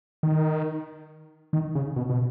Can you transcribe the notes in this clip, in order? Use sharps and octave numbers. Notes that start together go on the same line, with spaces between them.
D#3
D#3
C#3
B2
B2